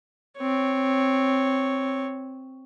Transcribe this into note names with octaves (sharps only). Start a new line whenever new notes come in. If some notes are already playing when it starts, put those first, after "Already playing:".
C4 C#5